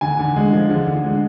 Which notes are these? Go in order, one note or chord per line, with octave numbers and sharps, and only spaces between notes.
D3 G#5
D3
G#3
F3
D3
D3
G#3